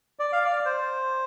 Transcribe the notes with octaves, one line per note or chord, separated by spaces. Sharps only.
D5
F5
D5
C5